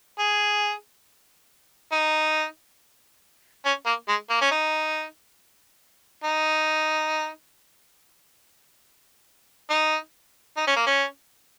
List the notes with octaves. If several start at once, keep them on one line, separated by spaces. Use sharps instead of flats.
G#4
D#4
C#4
A#3
G#3
A#3
C#4
D#4
D#4
D#4
D#4
C#4
A#3
C#4